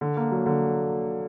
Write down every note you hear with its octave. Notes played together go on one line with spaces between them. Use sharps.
D3
A#3
F#3
D3